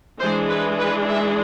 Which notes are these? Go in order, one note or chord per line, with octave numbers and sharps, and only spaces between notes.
E3 G#3 D4 C5
B4
B4
E5